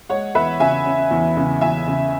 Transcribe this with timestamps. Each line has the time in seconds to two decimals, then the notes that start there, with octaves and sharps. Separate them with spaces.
0.09 G#3 C#5 F#5
0.35 E2 B4 E5
0.60 C#3 E5 G#5
0.86 C#4
1.11 E2
1.37 C#3
1.61 E2 E5 G#5
1.87 C#3